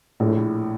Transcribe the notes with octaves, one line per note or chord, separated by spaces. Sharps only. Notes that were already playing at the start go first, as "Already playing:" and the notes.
A#1 A2
A2